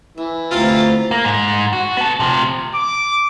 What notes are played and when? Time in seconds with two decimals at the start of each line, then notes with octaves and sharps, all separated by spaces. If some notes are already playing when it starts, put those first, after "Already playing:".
0.18 E3 E5
0.51 D2 C3 E4 F4 G4 A4 A#5 A6
1.11 A#3
1.24 G#2
1.73 F#4
1.97 B3 A4
2.20 C3 F3
2.75 D6